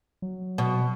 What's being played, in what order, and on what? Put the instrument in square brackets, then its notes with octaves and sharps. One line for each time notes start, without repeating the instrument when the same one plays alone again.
[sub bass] F#3
[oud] B2